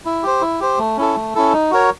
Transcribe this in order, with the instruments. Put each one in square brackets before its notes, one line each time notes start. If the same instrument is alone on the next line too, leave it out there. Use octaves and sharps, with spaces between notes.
[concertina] E4
G4 C5
E4
G4 C5
A3
C#4 E4 A4
A3
C#4 E4 A4
D#4
F#4 A#4 C#5